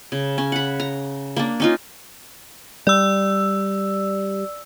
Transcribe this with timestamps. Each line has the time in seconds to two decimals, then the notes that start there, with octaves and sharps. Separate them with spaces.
0.12 C#3
0.38 C#4
0.52 F#5 B5
0.80 A#5
1.36 A#3 D4
1.60 C#4 D#4 F4
2.87 G3 D5 E6